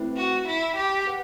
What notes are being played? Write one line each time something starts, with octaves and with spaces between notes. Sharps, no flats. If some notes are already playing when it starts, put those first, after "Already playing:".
Already playing: A3 C4 E4 B4
F#4
E4
G4
G4 B4 F#5